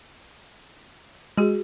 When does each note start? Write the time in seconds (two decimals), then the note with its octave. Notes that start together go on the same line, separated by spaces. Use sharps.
1.37 G#3 F#4 G#4